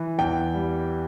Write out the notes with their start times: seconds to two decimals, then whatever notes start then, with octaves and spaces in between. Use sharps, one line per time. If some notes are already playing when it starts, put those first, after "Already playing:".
Already playing: E3
0.19 E2 G5
0.54 G3